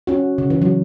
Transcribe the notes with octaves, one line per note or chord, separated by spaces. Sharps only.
C#4 F#4
C#3
E3
F#3